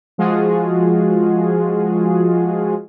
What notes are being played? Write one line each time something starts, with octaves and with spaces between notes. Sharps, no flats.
F3 G#3 F4 F#4 G#4